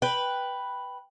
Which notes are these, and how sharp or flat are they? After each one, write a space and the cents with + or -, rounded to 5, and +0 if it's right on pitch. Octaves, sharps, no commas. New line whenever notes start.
B4 +0 G5 +0